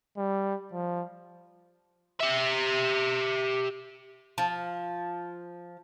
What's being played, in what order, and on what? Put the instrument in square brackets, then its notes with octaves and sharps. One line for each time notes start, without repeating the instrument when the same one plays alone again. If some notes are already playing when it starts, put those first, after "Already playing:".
[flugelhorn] G3
F3
[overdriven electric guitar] G4 E5
[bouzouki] F3